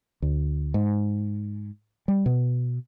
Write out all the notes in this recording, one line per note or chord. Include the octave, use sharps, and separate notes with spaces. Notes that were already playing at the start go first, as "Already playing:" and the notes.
D2
G#2
G3
B2